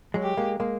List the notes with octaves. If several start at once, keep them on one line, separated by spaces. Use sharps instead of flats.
F#3 G#3
G4
G#3 A#3
G#3 A#3